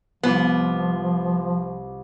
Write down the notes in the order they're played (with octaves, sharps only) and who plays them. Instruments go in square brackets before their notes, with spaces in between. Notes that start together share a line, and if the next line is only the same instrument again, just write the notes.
[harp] C2 F4 D6 [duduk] F3 [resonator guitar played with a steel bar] B3